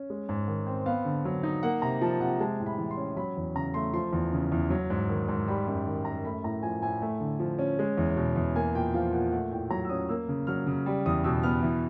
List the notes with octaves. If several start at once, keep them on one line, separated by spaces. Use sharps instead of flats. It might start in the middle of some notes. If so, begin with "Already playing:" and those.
Already playing: C#4
G#3
G#2
D#3
C4
B3 F5
D3
F#3
D#4
A#3 F#5
C3 A#5
F3 A5
C3 F#5
G#3 A5
A2
B5
E3
C6
C#4
F#3 B5
E2
C#3 A#5
A3 C6
F3 C6
E2
C#3
E2
F#3
G#2
D#3
G#2
G3 B5
F#2
D#3
F#2 A#5
A3 B5
A2 A#5
F3 G#5
A2 G#5
A3
D3
F3
C#4
G#3
E2
B2
E2
A#3 G#5
A#2 G5
F3 F5
A#2 F#5
A3 F#5
A2 G5
F#3 A#5
E6
C#4 D#6
A#3 E6
C#3
F#3 F6
C#3
G3
E2 D#6
B2 E6
B3 F6
E3